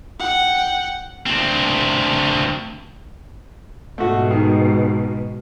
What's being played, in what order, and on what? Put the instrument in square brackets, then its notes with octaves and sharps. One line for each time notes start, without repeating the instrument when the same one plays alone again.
[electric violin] F#5 G5
[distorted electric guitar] D2 C4
[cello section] G#2 B2 [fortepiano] A3 F#4
[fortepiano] D#3